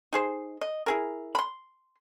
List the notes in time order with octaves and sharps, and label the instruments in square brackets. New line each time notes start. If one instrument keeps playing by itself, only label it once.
[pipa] D#4 G#4 C5
D#5
E4 G#4 A#4
B5 C6